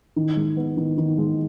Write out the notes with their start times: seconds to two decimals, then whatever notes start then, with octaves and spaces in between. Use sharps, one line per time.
0.16 D#3
0.37 G#3
0.57 B3
0.77 D#3
0.98 D#3
1.18 G#3